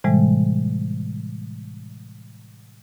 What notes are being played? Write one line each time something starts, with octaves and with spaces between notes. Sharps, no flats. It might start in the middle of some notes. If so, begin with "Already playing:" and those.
A2 C3 E3 G3 G#3